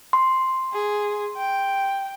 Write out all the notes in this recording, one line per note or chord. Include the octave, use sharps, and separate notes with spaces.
C6
G#4
G5